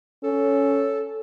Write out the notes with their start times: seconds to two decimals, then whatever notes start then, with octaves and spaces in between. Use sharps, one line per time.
0.24 C#4 A4